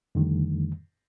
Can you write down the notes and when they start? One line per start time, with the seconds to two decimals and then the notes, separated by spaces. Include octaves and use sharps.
0.15 F2 D3 D#3 G3 A3